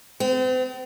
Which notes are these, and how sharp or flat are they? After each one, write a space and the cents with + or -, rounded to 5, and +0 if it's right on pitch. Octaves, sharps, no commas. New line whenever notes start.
C4 -40